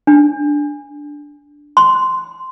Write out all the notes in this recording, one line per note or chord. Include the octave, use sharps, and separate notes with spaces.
D4
C6